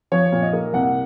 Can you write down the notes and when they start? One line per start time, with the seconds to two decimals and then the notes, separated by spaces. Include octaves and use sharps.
0.12 F3 C#5
0.32 A#2
0.43 D#5
0.53 A#3
0.73 C2 F#5